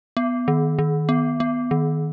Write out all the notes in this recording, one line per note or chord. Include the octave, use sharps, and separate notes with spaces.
B3
D#3
D#3
B3
B3
D#3